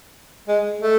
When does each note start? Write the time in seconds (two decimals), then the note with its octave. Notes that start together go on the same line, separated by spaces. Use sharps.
0.48 G#3
0.81 A3